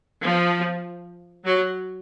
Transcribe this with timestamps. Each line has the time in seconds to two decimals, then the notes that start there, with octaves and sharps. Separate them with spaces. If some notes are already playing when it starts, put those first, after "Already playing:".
0.24 F3
1.45 F#3